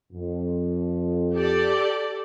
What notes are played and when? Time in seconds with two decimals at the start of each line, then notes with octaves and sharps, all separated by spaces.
0.13 F2
1.34 G4 A4 D5